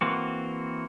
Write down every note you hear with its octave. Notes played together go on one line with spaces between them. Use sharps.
E3 A#3 C4 F#4